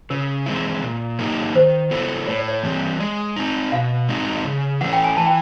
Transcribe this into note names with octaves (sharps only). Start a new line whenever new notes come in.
C#3 A#4
E3 G#3 C4 E4
A#2
F#3 A#3 D#4 G4
D#3 C5
F#3 B3 E4 A4
A2 C#5
D5
C#5
E3 G3 C4
G#3
C4 D#4
B2 F5
G#3 C4 D#4 F#4
C#3
E3 A3 C#4 F#5
G5
G#5
E3 A5
G5